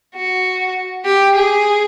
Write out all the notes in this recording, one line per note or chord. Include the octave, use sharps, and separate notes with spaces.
F#4
G4
G#4